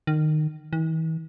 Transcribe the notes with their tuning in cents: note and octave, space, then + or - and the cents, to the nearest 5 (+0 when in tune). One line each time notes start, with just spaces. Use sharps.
D#3 -20
E3 -45